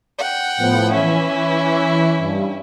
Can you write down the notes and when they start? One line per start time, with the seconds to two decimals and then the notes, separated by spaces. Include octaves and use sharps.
0.18 F#5 G5
0.57 A2 F3 B3
0.92 E3 C#4 E4
2.19 G2